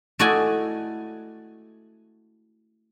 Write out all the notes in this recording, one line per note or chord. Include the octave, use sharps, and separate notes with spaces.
A3 E4 F#4 D5 D#5 G#5